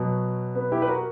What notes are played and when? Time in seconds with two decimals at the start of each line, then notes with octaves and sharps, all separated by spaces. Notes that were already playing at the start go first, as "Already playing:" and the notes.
Already playing: B2 F#3
0.55 B3
0.72 E4 G4
0.82 B4
0.88 F#4 A#4